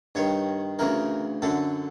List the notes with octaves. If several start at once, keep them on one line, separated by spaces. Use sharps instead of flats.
G2 D#3 C#5
D2 C#3 E3 A#4
F#2 D3 A4